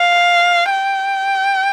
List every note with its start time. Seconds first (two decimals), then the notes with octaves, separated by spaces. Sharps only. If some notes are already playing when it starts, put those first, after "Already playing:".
Already playing: F5
0.71 G5